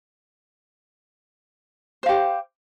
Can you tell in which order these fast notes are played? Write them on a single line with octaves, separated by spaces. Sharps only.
C5 F5 G4